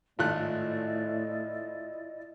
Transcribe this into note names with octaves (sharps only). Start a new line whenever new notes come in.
G#1 A2 A3 E4 F4 D5 D#5 F#6